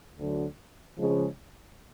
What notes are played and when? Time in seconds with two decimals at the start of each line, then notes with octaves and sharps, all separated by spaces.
0.16 D2 D3 F#3
0.98 C#3 F3 G#3